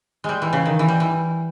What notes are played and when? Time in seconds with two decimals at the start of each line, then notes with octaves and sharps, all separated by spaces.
0.24 G3 G#3
0.42 E3
0.53 C#3
0.66 D#3
0.79 E3
0.88 G3
1.00 E3